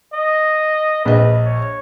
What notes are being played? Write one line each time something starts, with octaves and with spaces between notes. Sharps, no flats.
D#5
A#1 B4 D#5
C#5